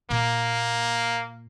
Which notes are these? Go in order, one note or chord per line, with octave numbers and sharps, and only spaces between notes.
A#2 A#3